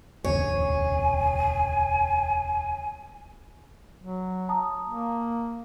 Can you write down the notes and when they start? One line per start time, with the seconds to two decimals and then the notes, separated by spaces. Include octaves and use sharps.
0.25 E1 D2 C#3 C#5 G#5
3.99 F#3
4.49 A5 A#5 D#6
4.87 A#3